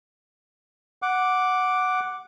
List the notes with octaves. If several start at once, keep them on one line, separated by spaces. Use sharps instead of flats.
F#5 D6